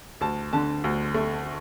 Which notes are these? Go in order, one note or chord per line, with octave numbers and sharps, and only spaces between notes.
D2 A5
D3 A5
D2
A3